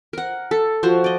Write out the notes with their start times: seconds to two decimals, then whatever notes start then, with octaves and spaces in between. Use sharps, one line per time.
0.13 A#4 F#5
0.51 A4
0.83 F3 F#4 C5
1.04 D5 D#5